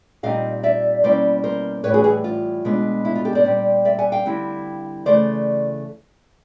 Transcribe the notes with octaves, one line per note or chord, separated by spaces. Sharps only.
A#2 G3 C4 D#4 D#5 F5
D5 E5
B2 G3 A#3 C#4 E4 C5 D5
A#4 C5
A2 E3 G3 B4 C#5
F#4 G#4
F#4 G#4
F4
B2 G#3 B3 D4
E4
F4
G4 A4
C5 D5
A#2 G3 C4
D5 E5
F#5 G#5
F5 G5
D3 G3 C4 E4
C#3 E3 A3 C5 D5